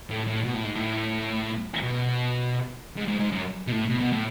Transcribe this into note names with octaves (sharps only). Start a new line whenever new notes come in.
A2
A2
B2
A2
G#2
A2
B2
G#2
G#2
G#2
F#2
B2
A2
B2
B2
A2